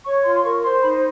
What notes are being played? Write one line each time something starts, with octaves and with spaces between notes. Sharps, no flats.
C#5 C#6
F4 C6
C6
A#4 C#6
C5 C6
D#4 B5